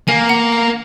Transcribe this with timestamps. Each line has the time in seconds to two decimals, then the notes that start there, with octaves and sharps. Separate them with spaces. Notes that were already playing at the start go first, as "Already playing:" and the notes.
0.08 A#3 F5 G#5
0.29 F#5
0.52 F5